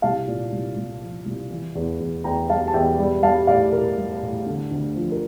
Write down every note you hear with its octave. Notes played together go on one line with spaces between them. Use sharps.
C2 F5 A5
A#2
C2
C2
F3
C2
E3
E2
E2
E2 G5 A#5
G3 F5 A5
A5
E2 E5 G5
G3
G3 F5 A5
A2 D5 F5
A2 A#4
G3
A2
D3
D2
F3
A#4